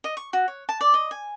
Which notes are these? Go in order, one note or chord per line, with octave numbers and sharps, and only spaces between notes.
D#5
C#6
F#4
C#5
A5
D5
D#5
G#5